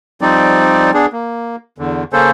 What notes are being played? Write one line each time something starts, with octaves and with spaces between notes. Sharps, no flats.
F3 G3 C4 D#4 D5
B3 D4 G#4
A#3
E2 D3
C#3 A#3 C#4 A4 C5